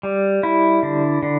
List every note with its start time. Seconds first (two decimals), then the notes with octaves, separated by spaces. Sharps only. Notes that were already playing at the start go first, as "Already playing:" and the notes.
0.03 G3
0.43 E4
0.83 D3
1.23 D3